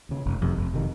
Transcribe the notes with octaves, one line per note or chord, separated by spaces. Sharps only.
D#2 C#3
F1
F2 C3 D#3
F1
C3 D#3